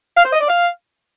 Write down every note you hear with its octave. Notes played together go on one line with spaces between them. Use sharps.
F5
C5
D#5
D5
F5